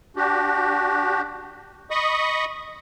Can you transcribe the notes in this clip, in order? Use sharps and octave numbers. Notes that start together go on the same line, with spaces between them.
D4 F#4 G4
D#5 B5 C#6 D#6